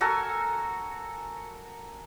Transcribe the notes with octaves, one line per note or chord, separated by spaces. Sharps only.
F#4 A4 A#4 G#5